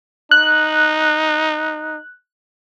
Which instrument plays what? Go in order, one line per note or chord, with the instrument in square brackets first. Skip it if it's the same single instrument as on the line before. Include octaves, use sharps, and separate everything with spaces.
[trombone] D#4 [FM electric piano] F#6